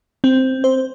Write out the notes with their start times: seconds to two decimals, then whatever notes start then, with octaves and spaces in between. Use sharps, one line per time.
0.24 C4
0.64 C5